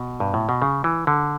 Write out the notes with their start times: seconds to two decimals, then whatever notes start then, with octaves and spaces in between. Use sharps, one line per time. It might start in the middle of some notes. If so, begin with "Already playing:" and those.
Already playing: B2
0.20 G2
0.34 A2
0.49 B2
0.62 C#3
0.84 E3
1.07 D3